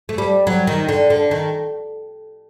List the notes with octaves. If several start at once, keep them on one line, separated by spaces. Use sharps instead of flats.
A3
G3
F#3
D#3
D3
D3
D#3